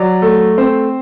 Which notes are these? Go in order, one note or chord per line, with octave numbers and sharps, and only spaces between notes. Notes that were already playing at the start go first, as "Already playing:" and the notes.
Already playing: F#3 D5
A3
C4 C5